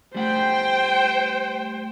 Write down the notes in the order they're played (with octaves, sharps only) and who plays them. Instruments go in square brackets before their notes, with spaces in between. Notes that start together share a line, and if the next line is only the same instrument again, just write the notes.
[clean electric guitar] G3 A3 F#5 [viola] C5 G5